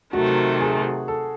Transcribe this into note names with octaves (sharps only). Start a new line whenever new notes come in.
C3 D#3 F#3 A3 F#4
G#4
A4